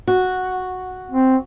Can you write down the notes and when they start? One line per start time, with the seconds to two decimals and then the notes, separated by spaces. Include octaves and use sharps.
0.08 F#4
1.11 C4